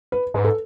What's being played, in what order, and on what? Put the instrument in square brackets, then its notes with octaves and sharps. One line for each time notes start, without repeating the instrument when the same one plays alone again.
[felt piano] B4
[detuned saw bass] G#2 [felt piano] B4
[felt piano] A4